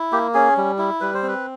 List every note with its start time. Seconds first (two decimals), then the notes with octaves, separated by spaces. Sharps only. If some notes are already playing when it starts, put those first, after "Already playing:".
Already playing: E4
0.12 A#3 G4
0.34 C#4 G#4
0.57 G3
0.78 E4
1.00 G3 B4
1.14 C5
1.23 C4
1.28 B4